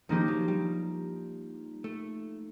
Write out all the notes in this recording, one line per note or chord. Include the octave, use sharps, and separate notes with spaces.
D#3 F3 A#3 D#4 G4
F#3
G3
A3